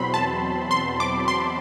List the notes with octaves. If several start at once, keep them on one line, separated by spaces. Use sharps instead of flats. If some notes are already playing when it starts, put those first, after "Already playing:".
Already playing: E2 B2 F#3 C4 B5 C6
A5
C6
D6
C6